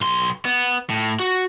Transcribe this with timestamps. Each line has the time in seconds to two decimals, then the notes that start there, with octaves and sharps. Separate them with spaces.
0.01 B1 C6
0.45 B3
0.90 A2
1.20 F#4